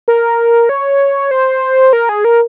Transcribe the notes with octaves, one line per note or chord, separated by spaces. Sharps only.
A#4
C#5
C5
A#4
G#4
A#4